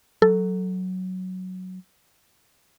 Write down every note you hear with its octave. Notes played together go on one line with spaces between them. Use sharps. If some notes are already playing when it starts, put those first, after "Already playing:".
F#3 A4